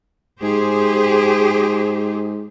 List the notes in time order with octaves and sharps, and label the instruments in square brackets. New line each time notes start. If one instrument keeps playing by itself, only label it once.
[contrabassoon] G#2 [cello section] G4 G#4 C5